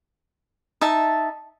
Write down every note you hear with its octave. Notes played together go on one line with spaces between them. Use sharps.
D#4 E5 A5